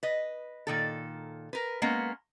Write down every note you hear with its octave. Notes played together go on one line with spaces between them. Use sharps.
B4 D#5
A#2 D#3 A4
A#4 B4
G#3 A#3 B3 C#4